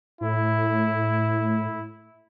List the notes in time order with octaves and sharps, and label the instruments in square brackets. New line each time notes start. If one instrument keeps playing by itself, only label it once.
[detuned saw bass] A2 [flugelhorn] E4